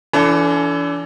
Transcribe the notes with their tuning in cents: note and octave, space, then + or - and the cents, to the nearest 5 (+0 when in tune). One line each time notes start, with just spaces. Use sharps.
E3 +25 D4 -35 A4 +0